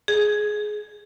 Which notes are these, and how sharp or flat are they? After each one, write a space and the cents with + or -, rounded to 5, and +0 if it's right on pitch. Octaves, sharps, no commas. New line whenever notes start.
G#4 +15